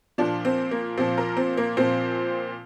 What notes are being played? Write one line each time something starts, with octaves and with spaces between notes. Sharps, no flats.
A#2 F3 D4
C4
A#3
A#2 F3 C4
A#4
C4
A#3
A#2 F3 C4